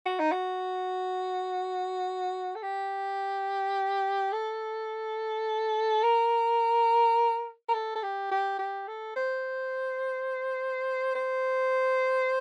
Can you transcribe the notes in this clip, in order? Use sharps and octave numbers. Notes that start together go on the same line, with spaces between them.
F#4
D#4
F#4
A4
G4
A4
A#4
A#4
A4
A4
G4
G4
G4
A4
C5
C5